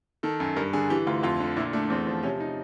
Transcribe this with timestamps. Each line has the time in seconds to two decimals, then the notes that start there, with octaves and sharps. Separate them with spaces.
0.23 D#3 A4
0.40 F#2
0.56 G2 A#4
0.73 D3 G#4
0.90 E3 G4
1.07 D2 F4
1.23 F2 F4
1.40 D3
1.57 A#2 E4
1.73 A3 D4
1.90 E2 C4
2.07 F3
2.23 C3 C#4
2.40 D#4